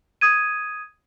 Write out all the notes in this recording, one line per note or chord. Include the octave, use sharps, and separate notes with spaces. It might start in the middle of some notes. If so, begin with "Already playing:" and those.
D#6 G#6 D#7